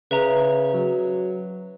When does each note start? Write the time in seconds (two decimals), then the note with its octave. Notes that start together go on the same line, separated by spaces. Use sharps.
0.11 C#3 B4 E5 A#5
0.74 F#3